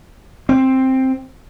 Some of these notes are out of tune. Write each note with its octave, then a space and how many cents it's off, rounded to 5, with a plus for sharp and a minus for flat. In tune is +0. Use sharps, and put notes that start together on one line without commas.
C4 +5